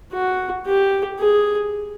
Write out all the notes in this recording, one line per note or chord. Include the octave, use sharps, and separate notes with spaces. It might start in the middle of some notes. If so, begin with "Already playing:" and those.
F#4
G4
G#4